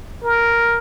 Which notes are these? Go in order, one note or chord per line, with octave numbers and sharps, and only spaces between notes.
A#4